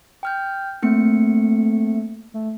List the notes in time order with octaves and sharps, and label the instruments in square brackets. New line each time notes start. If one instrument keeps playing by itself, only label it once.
[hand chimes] G5 F6 G6
[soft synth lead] A3 [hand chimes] A#3 C4 C#7
[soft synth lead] A3